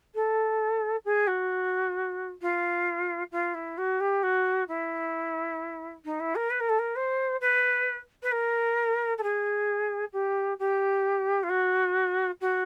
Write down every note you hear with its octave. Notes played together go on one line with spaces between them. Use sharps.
A4
G#4
F#4
F4
F4
E4
F#4
G4
F#4
E4
D#4
E4
A#4
B4
A#4
A4
A#4
C5
B4
B4
A#4
A4
G#4
G4
G4
F4
F#4
F#4